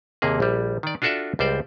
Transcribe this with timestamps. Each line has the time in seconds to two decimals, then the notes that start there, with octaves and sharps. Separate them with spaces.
0.22 D#2 C3 A#3 G#4
0.40 A#1 G3
0.83 D#3 D5
1.02 D4 F4 F#4 A4 D5 E5
1.39 C#2 G3 C5 D5